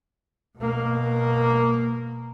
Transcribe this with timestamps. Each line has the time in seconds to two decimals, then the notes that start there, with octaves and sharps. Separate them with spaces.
0.58 B2 A#3